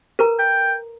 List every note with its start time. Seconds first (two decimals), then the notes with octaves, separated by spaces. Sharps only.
0.19 A#4 B4 A#5
0.39 G5